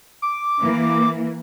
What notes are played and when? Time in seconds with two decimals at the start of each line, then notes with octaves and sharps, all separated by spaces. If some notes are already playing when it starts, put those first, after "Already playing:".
0.22 D6
0.61 E3 A#3